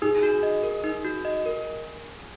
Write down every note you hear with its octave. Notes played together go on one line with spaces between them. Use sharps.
D#4 G#4
F#4
D#5
A#4
D#4
F#4
D#5
A#4